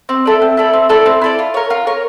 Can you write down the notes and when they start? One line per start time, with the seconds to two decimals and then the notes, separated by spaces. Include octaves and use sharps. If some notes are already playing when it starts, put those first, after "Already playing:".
0.09 C4
0.26 E4 A4 D5
0.42 C4
0.57 E4 A4 D5
0.73 C4
0.89 E4 A4 D5
1.06 C4
1.21 E4 A4 D5
1.39 F4
1.54 A#4 C#5
1.70 F4
1.87 A#4 C#5